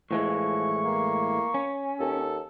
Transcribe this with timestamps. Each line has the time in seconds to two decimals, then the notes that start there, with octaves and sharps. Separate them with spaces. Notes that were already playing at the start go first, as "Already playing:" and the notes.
0.11 A2 E3 F3 G#3 C#6
0.84 A#3
1.54 C#4
2.00 D#2 A4